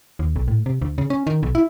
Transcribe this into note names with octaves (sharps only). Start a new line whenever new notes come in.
D#2
B1
A2
C3
D2
C#3
C#4
D#3
B1
E4